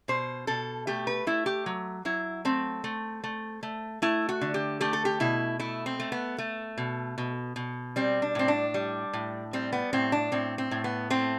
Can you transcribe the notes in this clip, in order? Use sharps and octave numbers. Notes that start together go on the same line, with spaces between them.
B2 C5
B2 A4
A3 G4
B4
A3 E4
G4
F#3
F#3 E4
A3 C4
A3
A3
A3
A3 E4
F#4
D3
G4
A3 G4
A4
G4
B2 E4
A3 E4
C4
A3
B3
A3
B2
B2
B2
G3 C4
D4
A2 C4
D4
G3
A2
G3 C4
B3
A2 C4
D4
A2 C4
C4
A2
B3
A3 C4